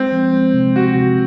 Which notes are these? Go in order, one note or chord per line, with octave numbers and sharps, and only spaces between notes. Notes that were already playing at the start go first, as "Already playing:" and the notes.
Already playing: G#3 C4
F3
G#3
C3
C3 F#4
C3